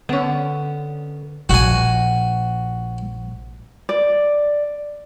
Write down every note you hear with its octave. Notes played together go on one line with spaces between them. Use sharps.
D3 B3 C#4
A#1 F#4 G#5
D5